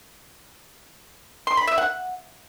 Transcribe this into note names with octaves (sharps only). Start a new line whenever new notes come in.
C6
B5
E5
F#5